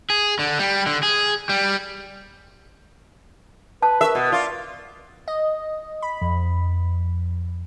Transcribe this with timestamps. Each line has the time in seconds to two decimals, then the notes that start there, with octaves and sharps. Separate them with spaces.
0.10 G#4
0.39 D3
0.59 G3
0.86 D3
1.03 G#4
1.49 G3
3.82 B4 A5
4.01 A#4 E5 C#6
4.15 B2
4.32 F4 D5
5.28 D#5
6.02 B5
6.21 F2